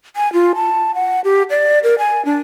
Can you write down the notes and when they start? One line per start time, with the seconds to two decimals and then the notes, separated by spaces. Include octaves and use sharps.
0.16 G#5
0.33 F4
0.55 A5
0.95 F#5
1.24 G4
1.50 D5
1.83 A#4
1.99 G#5
2.25 D4